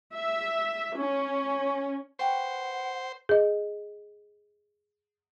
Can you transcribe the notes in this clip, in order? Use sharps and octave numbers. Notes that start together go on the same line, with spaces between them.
E5
C#4
B4 C5 F#5 G5 C#6
G#4 D#5